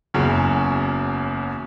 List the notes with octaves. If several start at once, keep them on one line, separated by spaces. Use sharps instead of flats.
F#1 E2 C#3 F#3 C#4